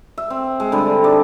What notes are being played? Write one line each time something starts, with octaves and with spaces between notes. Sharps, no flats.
E5
C4
G#3
D3 G3
D#4 D5 A5